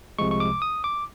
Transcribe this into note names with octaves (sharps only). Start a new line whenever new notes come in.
C2 C3 F3 G#3 C#6
C#6
D6
D#6
D6